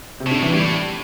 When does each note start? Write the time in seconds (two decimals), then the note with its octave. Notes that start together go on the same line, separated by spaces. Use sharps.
0.20 C3
0.27 A2 D3
0.43 E3
0.53 A2 G3